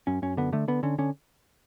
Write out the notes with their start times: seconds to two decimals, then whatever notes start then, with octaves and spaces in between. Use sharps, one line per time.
0.07 F#2 C#4
0.22 F#2 C#4
0.37 D3 B3
0.53 D3 A3
0.68 D3 B3
0.83 D3 C#4
0.98 D3 C#4